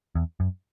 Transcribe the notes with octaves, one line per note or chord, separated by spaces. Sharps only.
E2
F#2